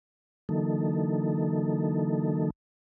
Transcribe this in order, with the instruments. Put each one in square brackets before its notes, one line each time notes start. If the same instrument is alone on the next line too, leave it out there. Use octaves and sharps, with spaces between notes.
[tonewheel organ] D3 E3 F#3 A#3 D#4 A4